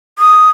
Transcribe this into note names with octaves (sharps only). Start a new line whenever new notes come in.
D#6